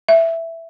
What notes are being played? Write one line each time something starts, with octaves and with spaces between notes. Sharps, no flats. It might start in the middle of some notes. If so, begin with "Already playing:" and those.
E5